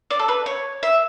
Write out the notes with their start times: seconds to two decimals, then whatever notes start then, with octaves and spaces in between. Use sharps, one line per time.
0.11 D5
0.19 A4
0.28 B4
0.46 C#5
0.83 E5